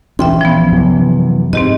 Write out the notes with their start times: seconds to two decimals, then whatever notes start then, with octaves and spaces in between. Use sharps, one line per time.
0.19 A#1 E3 C#4 E5 G5 C6
0.41 F3 B3
0.71 F#2 C3 E3
1.53 G#2 C4 G4 D#5